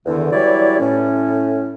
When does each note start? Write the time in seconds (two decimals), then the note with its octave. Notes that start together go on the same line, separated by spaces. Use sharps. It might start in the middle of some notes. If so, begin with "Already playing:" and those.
0.06 E2 D3 D#3
0.32 E3 F#3 G3 E4 C#5 D5
0.79 A2 C#4